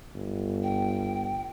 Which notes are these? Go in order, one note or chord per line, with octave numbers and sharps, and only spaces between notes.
G1
G5